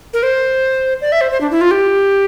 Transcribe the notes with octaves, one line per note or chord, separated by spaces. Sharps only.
A#4
C5
D5
E5
C5
C5
D4
E4
F4
G4